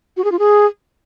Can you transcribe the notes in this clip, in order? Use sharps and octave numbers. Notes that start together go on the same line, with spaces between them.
F#4
G#4
F4
G#4